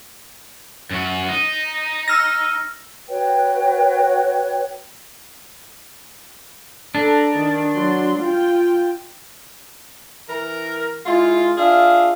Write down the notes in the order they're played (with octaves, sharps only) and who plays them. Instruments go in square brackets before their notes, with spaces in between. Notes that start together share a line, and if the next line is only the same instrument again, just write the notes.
[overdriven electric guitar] F#2 F#4
D#4
[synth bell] E6 F6 A#6
[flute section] F#4 B4 C#5 G5
[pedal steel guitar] D4 [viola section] A4 A#5
[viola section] D#3
F#3 C6
F4 G5
[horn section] E3 A#4
G#3 E4 F4
D4 F4 G#4 E5 F5